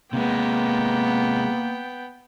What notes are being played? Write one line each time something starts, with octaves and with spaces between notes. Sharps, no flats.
C3 G#3 A#3 B3 G5